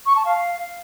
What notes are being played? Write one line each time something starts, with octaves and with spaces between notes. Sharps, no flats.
C#6
A5
F5